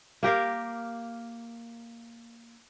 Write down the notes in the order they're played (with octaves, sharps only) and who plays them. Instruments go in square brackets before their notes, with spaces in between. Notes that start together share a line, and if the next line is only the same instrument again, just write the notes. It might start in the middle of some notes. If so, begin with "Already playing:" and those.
[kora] A#3 G4 A#4 F5